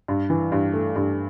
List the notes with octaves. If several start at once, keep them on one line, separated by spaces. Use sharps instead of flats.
G2
E3
G2
A3
G2